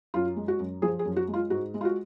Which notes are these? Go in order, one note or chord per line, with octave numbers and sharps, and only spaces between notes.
F#2 F4
G#3
F#4
F#2
F3 G#4
G#4
F#2
F#4
G#3
F4
G#2 F#4
G#3
F4
F#4